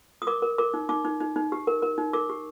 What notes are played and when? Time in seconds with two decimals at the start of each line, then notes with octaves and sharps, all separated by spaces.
0.22 D#6
0.27 A#4 D6
0.42 A#4
0.58 A#4 D6
0.74 D#4
0.89 D#4 D6
1.05 D#4
1.20 D#4
1.36 D#4
1.52 G4
1.67 A#4
1.82 A#4
1.98 D#4
2.13 A#4 D6
2.29 G4